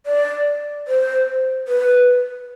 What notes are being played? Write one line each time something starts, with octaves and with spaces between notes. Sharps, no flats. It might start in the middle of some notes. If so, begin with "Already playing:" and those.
D5
C5
B4